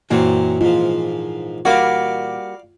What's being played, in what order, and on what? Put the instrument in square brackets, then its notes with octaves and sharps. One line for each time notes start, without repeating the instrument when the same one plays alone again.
[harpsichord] F#2 F#3 C4 [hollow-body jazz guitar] A#2 E3
[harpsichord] G#2 F3 [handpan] F4
[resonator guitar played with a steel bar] G3 A#3 F#4 [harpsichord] D5 F5